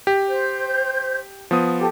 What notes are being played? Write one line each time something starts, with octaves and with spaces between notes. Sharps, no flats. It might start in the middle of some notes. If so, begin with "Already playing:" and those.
G4
C5 G6
F3 B3 D#6
G4 A4